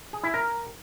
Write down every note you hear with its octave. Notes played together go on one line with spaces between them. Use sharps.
G#4
E4
A#4